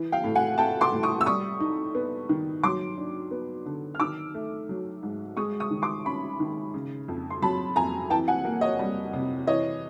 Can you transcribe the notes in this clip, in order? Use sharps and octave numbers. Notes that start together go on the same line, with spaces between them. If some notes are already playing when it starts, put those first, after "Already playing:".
Already playing: E3
F5 G5
A2
F#5 G#5
A3 G5 A5
C6 D6
A2
C#6 D#6
E6
G3 C#6 D#6
D#4
B3
D#3
F#3 C6 D6
D4
B3
D3
F6
D#3 D6 E6
A3
F#3
G#2
G#3 C#6 D#6
C#6 D#6
D#3
C6 D6
C#4 B5 C#6
D#3
C#3
F2
C6
F#3 A5 B5
F2 G#5 A#5
E3 G5 A5
F#5 G#5
A#3
C#5 D#5
G3
C3
E3 C#5 D#5